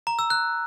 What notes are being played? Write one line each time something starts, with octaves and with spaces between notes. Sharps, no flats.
A#5
E6
F#6